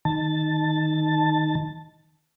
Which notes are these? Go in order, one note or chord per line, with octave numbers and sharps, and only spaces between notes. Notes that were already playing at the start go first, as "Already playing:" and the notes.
D#3 A5